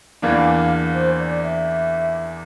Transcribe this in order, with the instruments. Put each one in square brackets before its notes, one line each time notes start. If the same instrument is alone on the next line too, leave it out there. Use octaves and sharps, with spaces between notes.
[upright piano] E2 E3 A#3 D4 [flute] F5
[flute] C5
D5
E5